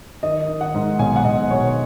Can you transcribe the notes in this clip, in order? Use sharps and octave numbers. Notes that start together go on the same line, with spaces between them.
D#3 D#5
D#3
F#5
G#2
B1 G#5
F#5
B1 D#5
B2 C#5